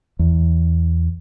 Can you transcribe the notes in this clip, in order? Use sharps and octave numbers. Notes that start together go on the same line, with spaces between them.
E2